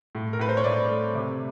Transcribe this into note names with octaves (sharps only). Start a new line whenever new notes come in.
A2
A#4
A2 B4
C5
C#5
A2 D5
A3
C3